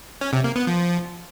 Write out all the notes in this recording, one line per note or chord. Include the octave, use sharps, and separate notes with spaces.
C#4
C3
A#3
B3
F3